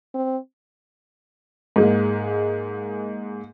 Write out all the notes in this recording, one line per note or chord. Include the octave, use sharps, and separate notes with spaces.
C4
G#2 G#3 A#3